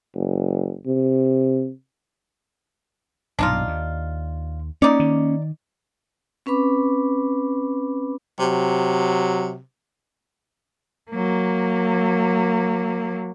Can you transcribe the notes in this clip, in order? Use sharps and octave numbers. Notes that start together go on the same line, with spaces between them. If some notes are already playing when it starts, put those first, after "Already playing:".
F#1
C3
B1 G2 A#2 D4 D#4 F4
D#2
A#3 C#4 D#4 D5
D#3
C4 C#4 B4 B5 D6
C3 F#3
F#3 A#3